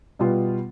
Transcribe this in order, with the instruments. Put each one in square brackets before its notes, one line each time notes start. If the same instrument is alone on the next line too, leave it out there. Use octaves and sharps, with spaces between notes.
[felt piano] B2 G3 B3 F4